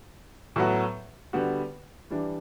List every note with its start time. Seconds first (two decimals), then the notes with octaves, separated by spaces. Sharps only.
0.56 A2 F#3 B3 F#4
1.33 D3 G3 B3 F#4
2.10 E3 G3 D4